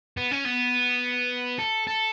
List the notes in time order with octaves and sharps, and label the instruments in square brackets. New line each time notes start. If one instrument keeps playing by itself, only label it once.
[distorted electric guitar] B3
C#4
B3
A4
A4